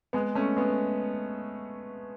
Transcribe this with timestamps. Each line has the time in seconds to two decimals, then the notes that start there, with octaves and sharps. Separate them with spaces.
0.13 G#3 B3
0.35 A3 C#4
0.57 G#3 B3